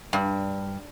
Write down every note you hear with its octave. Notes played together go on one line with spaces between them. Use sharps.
G2